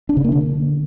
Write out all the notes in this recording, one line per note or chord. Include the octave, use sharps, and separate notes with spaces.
D4
C#3
A#3
D3